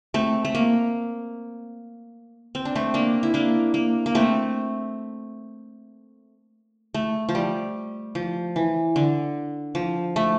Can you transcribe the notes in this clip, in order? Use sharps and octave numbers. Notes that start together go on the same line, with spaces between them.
A3 C4
A3
A#3
C4
D4
A3 C4
A#3 D4
E4
A#3 D4
A#3
A#3
A3 C4
A3
F3
G3
F3
E3
D3
F3
A3